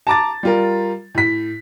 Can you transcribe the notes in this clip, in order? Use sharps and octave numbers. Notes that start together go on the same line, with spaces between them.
A5 A#5 D6 A6
G3 F4 A#4
A2 B6